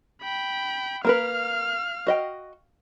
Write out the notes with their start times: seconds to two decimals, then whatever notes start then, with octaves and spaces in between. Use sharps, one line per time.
0.22 G5 B5
1.05 A#3 A#4 B4 F5 F6
2.07 F#4 D#5 G5